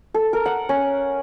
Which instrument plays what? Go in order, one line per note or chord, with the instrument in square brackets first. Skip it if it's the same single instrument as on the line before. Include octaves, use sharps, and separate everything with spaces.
[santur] A4
A#4
F#5
C#4